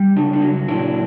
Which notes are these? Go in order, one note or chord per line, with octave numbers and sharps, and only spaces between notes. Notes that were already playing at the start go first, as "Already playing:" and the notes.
Already playing: G3
C#3 D4
D4
F#3
A#2 D4 E4